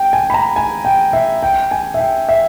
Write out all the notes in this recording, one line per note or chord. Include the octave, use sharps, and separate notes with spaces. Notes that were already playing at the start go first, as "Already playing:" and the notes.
Already playing: G5
G#5
B5
A#5
G#5
G5
E5
G5
G#5
E5
G5
E5